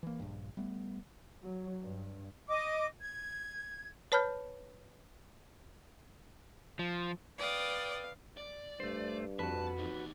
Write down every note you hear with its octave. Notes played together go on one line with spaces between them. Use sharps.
E3 A#3
A#1 G2
G3 A3 B3
F#3
G2
D#5 D6
G#6
B4 C#5 A5 B5 F6 G6
F3
B4 D5 F5 G5 D#6
D5
G2 A3 C5
F2 F#4 B4 A5
E2 D#4